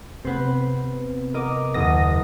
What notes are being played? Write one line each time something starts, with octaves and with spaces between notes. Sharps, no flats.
C3 B3 C4 B4 C5
A#4 D#5 D6
F#1 D#2 D#6 A#6